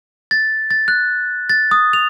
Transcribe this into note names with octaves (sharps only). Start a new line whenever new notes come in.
A6
A6
F#6
A6
D#6
F7